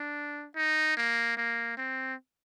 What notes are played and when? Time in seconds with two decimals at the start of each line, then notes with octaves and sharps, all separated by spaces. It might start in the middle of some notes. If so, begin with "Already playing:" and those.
Already playing: D4
0.56 D#4
0.97 A#3
1.37 A#3
1.78 C4